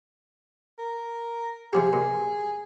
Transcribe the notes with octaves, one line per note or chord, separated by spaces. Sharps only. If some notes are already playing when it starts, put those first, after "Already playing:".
A#4
C3 F3 G4 G#4
A#2